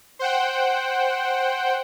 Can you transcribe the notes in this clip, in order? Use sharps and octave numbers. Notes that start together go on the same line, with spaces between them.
C5 F#5 G5